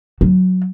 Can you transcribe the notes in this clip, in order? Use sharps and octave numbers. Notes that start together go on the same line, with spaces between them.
F#3